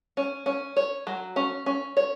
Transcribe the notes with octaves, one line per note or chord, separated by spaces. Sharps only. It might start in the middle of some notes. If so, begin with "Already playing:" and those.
C#4
C#4
C#5
F#3
C#4
C#4
C#5